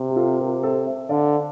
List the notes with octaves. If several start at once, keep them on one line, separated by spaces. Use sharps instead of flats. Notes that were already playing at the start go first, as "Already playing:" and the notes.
Already playing: C3
G4
F4 A4
G4 A#4
A4 C5
C5 E5
D3 D5 F5